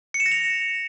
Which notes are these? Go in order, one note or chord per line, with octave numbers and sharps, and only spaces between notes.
C#7
E7
A#6
F7